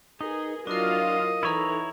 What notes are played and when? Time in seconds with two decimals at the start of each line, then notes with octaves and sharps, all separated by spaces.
0.21 D#4 G#4 A#4 B4
0.67 F#3 D4 E4 F4 A#4 D#5 F5
1.43 E3 D#4 E4 A4 C#5 A#5